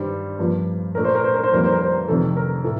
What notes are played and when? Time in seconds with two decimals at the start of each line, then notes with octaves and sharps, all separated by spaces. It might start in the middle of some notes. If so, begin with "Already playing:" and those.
Already playing: G2 D#3 G3 C5
0.39 G2 F3 A#3 D4
0.95 A#2 A3 D4 A#4
1.05 C5
1.15 A#4
1.24 C5
1.34 A#4
1.43 C5
1.52 F2 D#3 G3 A#3 A#4
1.64 C5
1.72 A#4
1.82 C5
1.92 A#4
2.08 F2 C3 D#3 A3 D4 A4
2.37 A#4
2.64 A2 A4